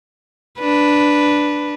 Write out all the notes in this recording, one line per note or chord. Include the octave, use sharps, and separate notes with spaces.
D4 B4